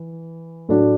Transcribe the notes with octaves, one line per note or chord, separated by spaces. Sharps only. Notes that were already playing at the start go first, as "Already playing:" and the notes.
Already playing: E3
A2 F#3 A3 D4